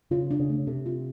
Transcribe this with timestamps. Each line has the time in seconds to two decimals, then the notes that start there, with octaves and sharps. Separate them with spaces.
0.11 C#3 F4
0.31 D4
0.40 C#3
0.49 A3
0.58 C#3
0.67 C3 A4
0.86 F4